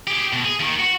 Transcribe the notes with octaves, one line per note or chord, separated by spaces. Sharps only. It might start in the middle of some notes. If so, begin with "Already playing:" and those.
G4 G#4
B2
G#4
D#2 D#3
F#4